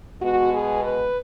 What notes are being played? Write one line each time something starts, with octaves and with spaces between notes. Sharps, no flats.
B2 G#3 B3 F#4
G#4
B4